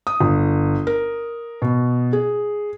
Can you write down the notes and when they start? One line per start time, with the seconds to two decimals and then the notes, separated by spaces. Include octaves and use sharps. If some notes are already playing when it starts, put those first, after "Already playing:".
0.07 D#6
0.21 G1
0.87 A#4
1.62 B2
2.13 G#4